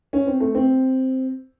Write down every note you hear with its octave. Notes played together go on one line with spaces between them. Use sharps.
C#4
C4
A3
C4